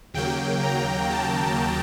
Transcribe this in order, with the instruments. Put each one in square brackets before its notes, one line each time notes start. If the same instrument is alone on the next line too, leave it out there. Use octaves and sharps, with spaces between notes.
[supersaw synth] D#2 C#3 F#3 A#3 G5
A#5
A5